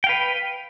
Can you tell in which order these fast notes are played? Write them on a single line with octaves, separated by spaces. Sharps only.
G5 F5 B4